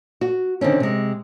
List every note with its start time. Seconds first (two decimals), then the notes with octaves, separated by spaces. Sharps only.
0.21 F#4
0.61 D3 D#3 C4 C#4
0.80 C3 G#3